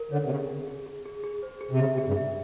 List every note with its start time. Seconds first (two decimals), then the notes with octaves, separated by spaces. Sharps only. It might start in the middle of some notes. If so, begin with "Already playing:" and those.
Already playing: A#4
0.12 D3 C#5
0.25 C3
0.31 C#3 G#4
0.49 G#4
0.68 G#4
0.86 G#4
1.05 G#4
1.24 G#4
1.43 C5
1.61 G#4
1.71 C3
1.79 C#3 E5
1.93 C3
1.98 G#4
2.07 G2
2.17 E5